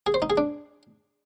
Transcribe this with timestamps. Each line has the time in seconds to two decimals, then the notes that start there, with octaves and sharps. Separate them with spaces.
0.06 G#4
0.14 C5
0.22 D#4
0.30 G#4
0.37 D4